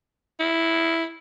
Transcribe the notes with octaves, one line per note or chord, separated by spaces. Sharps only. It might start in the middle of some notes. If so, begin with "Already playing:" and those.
E4